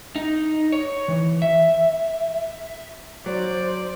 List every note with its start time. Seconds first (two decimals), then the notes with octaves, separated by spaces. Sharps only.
0.16 D#4
0.72 C#5
1.08 E3
1.42 E5
3.26 F#3 C5 D5